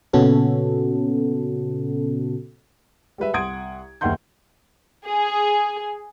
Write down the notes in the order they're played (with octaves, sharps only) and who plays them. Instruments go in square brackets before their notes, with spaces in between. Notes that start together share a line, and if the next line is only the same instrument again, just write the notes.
[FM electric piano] A#2 C#3 B3 C#4 F#4 A4
[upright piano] G3 G#3 B4 E5
C2 F#5 C6 D#6 G#6 D7
F#1 D#2 E5 F#5 C6 G6
[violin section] G#4